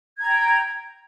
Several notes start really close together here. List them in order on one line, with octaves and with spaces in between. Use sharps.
G#6 A#5 G5